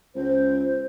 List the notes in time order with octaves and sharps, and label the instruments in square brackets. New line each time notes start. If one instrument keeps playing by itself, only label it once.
[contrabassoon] C#2 [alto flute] C5